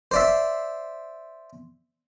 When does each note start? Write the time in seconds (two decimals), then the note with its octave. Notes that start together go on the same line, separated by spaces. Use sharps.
0.11 C5 D5 E5